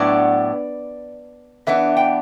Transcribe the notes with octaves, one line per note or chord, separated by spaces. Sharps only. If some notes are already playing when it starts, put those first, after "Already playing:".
Already playing: A2 F#3 B3 D4 D5
E3 B3 D4 E5
G5